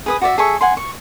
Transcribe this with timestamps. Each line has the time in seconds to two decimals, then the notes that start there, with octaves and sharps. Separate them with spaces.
0.06 G#4 B4 D#6
0.21 F#4 D5 E5
0.38 G#4 A4 E5 C#6
0.61 F#5 G#5 C6
0.77 C#6